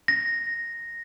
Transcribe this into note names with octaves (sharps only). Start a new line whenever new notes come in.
A#6